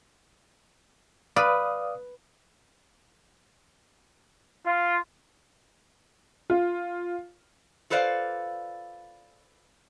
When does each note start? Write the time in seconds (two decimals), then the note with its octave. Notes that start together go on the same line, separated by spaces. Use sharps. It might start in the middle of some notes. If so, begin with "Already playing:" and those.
1.36 B4 D5 F5 D#6
4.66 F4
6.50 F4
7.90 F4 A4 B4 C5 D5 F5